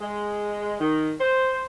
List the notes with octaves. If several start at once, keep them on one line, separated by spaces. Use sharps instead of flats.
G#3
D#3
C5